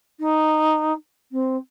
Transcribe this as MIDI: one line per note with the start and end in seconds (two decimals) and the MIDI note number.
0.19 0.92 63
1.32 1.56 60